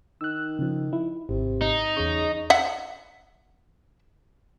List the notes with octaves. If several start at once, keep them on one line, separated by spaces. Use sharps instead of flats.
D#3 E6 F#6
C#3 F3
E4
G#1 C3
D#4
E2 C#3 C#6
E5 F#5